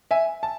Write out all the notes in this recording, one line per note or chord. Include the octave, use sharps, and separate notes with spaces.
E5 G#5
A5